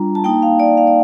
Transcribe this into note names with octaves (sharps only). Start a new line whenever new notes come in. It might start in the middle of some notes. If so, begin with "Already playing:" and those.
Already playing: G3 D4 F4 A#5
A5
A#3 D#4 G5
F5
D5
F5
D5